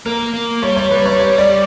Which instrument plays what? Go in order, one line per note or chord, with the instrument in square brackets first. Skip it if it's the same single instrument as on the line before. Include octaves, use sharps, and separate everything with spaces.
[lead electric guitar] A#3 [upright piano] A#4
[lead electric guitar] A#3
[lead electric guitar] G3 [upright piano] C#5
[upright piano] C#5
[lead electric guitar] G3 [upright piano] B4
[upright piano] C#5
C#5
D5